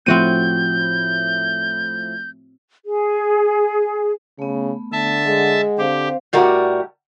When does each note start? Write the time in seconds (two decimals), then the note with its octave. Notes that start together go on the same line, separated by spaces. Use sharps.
0.06 A2 F3 C4 E4 F#4 G6 D#7
2.85 G#4
4.39 C#3 A3 B3
4.93 D3 E5 A5
5.26 G#3 F#5
5.78 D3 C4 G4 C5 F5
6.33 A2 G3 F#4 A#4